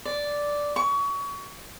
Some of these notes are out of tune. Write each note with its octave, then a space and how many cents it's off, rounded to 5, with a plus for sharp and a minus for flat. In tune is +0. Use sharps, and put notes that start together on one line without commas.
D5 -5
C#6 +25